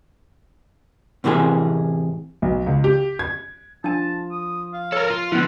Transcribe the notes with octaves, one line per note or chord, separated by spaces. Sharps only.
A2 C3 E3 C4 G#4
B1
C#2
G4
G#6
F3 D4 G#5 A5
D#6
F5
A4 A#4 C#5
F4
D3 F3 B3 E4 F#5